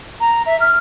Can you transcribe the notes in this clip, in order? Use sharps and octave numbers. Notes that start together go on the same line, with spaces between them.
A#5
E5
F6